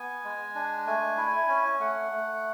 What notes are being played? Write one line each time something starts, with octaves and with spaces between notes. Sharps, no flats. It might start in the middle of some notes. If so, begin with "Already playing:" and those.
Already playing: B3 G#5
G#3
D4
A3 G#5
E4
C#4
A3 F#5
A3